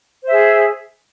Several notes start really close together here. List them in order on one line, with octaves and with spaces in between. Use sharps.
C5 E5 G#4